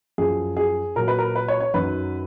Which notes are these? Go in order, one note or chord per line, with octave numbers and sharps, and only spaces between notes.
F#2 F3 G#4
G#4
A#2 F#3 A#4
B4
A#4
B4
C#5
C#5
F#2 D#3 F#3 B4